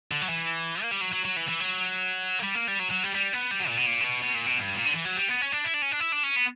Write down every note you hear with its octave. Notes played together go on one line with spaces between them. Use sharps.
D3
F#3
E3
A#3
G3
F#3
F#3
F#3
E3
E3
F#3
A#3
G3
A#3
G3
F#3
F#3
G3
G3
B3
G3
F#3
A#2
B2
A#2
C#3
B2
B2
A#2
B2
G2
A#2
D3
E3
F#3
G3
B3
C#4
D4
E4
D4
C#4
D4
E4
D4
C#4
B3